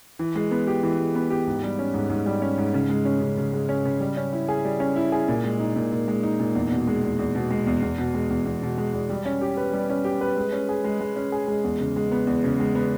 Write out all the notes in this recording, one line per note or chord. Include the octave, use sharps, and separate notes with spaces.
E3
G#3
B3
G4
E3
G#3
B3
G4
G#2
G3
C#4
G#2
G#2
G3
C#4
G#2
C#3
G#3
C#4
C#3
C#3
G#3
C#4
C#3
G3
C#4
E4
G#4
G3
C#4
E4
G#4
A#2
G#3
D#4
A#2
A#2
G#3
D#4
A#2
E2
B2
G#3
E2
E2
B2
G#3
E2
E2
B2
G#3
E2
E2
B2
G#3
E2
G3
C#4
G4
B4
G3
C#4
G4
B4
G#3
C#4
G#4
G#3
G#3
C#4
G#4
G#3
E2
C#3
G#3
B3
E2
C#3
G#3
B3